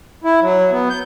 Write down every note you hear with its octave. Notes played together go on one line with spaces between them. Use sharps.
E4
F#3
B3
G6